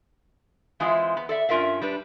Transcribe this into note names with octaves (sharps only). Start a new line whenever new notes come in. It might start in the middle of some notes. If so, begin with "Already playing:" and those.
E3 G#3 C4 E4 F4 G#4
B3
A4 D5 E5
G2 C#4 F4 A#4 E5 F5
G3 D4 B4